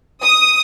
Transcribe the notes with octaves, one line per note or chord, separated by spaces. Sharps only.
D#6